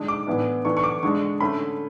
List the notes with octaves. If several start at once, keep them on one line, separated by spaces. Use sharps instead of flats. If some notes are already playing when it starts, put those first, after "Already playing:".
Already playing: D3 G#3 D4
D6
A2 E3 B3 D4
E3 A3 D4 C#6
C#6
D6
D3 G#3 D4 C#6
D3 A3 C#4 B5